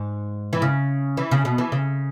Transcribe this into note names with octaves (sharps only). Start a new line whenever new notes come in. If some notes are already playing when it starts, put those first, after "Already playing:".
Already playing: G#2
E3
C#3
E3
C#3
B2
E3
C#3